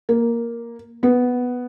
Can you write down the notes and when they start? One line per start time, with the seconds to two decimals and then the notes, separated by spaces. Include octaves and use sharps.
0.09 A#3
1.03 B3